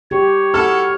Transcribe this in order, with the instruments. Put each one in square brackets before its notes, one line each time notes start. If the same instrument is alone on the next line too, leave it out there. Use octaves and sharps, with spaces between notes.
[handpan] G4 [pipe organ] C#5
[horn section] E4 F#4 A4 [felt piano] F6